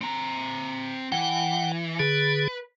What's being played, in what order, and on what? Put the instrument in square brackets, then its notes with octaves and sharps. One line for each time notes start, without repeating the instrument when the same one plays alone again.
[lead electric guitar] C4 A#5
[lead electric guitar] E3 [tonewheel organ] F#5 G5
[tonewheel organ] D3 G#4 [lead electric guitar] B4